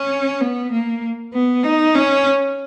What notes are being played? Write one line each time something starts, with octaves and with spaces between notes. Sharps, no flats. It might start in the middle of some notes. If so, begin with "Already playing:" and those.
Already playing: C#4
B3
A#3
B3
D#4
C#4